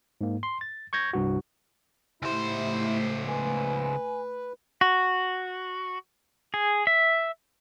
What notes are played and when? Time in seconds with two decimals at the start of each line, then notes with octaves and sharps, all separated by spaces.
0.21 G#2 A#3
0.43 C6
0.61 A6
0.93 C#6 G6 G#6 A#6
1.13 C2 G2 F#4
2.23 C#2 A2 A3 E4 G4 C5
3.27 B4 G#5
4.81 F#4
6.54 G#4
6.87 E5